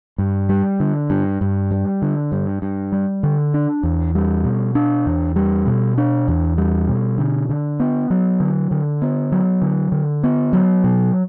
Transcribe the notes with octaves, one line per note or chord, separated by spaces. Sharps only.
G2
G3
D3
G2
G2
G3
D3
G2
G2
G3
D3
D4
E2
G3
B2
D4
E2
G3
B2
D4
E2
G3
B2
D3
D3
B3
F#3
D3
D3
B3
F#3
D3
D3
B3
F#3
B2